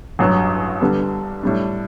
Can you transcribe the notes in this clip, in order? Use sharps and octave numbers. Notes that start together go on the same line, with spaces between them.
A1 G2 F#3
D3 G3 B3
A2 G3 D4